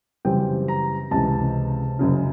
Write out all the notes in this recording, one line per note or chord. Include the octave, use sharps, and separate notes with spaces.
F#2 C#3 E3 G3 C4 G5
A#5
C#2 C3 E3 A5
F#1 F#2 C#3